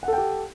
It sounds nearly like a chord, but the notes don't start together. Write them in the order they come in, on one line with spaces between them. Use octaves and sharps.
F#5 A4 G5 G4